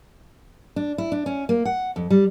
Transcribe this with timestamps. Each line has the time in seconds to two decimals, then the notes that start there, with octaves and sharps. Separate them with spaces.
0.76 D4
0.98 E4
1.12 D4
1.26 C#4
1.49 A#3
1.65 F#5
1.96 F2
2.10 G3